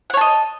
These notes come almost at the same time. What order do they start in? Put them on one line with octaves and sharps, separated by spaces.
F#5 C#5 A5 D#5